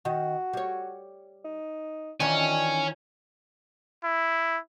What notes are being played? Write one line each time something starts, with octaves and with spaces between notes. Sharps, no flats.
D#3 F#4
G3 C#5
D#4
D#3 E3 D4 F4 C#5 G#5
E4